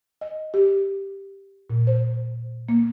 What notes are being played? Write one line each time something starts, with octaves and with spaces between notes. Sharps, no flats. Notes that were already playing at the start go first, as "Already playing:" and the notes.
D#5
G4
A#2
C5
A#3